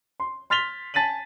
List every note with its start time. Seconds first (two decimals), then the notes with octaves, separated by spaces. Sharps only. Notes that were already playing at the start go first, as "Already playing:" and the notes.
0.20 C6
0.50 C6 F6 A6 B6 F7 G7
0.94 G#5 A5 A6 B6 D#7 F#7